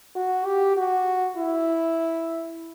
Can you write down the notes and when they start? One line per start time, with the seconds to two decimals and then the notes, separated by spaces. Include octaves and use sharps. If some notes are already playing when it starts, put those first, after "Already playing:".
0.15 F#4
0.45 G4
0.77 F#4
1.37 E4